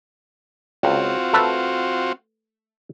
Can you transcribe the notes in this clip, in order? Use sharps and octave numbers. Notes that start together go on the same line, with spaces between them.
C#2 C4 F4 F#4
A3 A4 B4